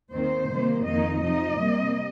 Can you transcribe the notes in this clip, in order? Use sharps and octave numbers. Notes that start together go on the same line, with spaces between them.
D#2 D#3 C4 C5
C3 D#3 G3 A#3
F2 D#3 A#3 D#4 D#5
C3 F3 D#4 D#5
C3 G3 A#3